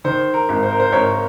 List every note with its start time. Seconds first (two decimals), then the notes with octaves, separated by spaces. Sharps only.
0.04 D#3 C5
0.34 A#4
0.49 G#1
0.63 C5
0.71 A#4
0.80 C5
0.92 G#1 A#4 C#5